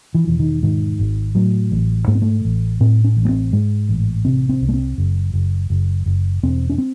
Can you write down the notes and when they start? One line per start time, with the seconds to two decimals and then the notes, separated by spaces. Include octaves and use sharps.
0.14 E3
0.27 E1 E3
0.39 D#3
0.63 G#2 D#3
0.99 G#1
1.35 A2 F#3
1.72 A1
2.08 G#2 A3
2.15 C4
2.22 A3
2.45 A1
2.80 A2 C4
3.04 C#4
3.17 A1
3.25 A3
3.29 C4
3.52 G#2 G#3
3.89 A1
4.25 C3 C4
4.49 C4
4.61 C2
4.69 A3
4.74 C4
4.98 F#1
5.33 F#1
5.70 F#1
6.06 F#1
6.43 E1 C4
6.70 C#4
6.78 C4